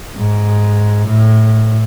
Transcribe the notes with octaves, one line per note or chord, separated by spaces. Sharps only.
G#2
A2